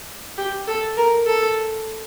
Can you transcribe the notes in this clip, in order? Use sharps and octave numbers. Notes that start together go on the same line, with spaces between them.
G4
A4
A#4
A4